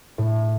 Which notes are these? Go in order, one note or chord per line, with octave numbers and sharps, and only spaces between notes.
A2